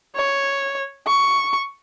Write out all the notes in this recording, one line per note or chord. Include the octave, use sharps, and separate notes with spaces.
C#5
C#6